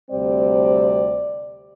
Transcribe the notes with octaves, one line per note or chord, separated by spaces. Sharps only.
D2 C3 G3 C4 D5